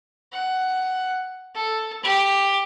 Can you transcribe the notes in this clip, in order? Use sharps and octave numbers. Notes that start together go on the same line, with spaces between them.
F#5
A4
G4